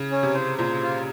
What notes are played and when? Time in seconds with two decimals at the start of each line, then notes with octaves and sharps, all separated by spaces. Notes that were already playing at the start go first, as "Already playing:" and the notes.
Already playing: C#3
0.11 C#4
0.23 C3
0.34 C5
0.58 A#2 C5
0.83 F4